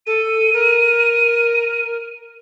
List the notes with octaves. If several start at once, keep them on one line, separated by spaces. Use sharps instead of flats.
A4 D#7
A#4